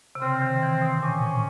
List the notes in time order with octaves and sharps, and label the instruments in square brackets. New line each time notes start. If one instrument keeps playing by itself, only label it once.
[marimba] C3
[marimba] C#3 [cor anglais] C4
[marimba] D#3
E3
B2
[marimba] A#2 [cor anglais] C#4
[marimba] A2